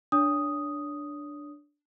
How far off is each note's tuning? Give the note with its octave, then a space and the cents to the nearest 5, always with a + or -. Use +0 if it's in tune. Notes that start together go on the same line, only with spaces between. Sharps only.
D4 +0 C#5 +30 D#6 +0